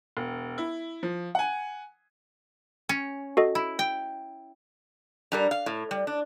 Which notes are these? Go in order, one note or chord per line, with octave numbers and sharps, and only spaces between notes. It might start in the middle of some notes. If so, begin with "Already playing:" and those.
E1
E4
F3
F#5 G#5
C#4
F#4 A4 D#5
E4
G5
G2 G3 A#4
F5
A2
G3
D4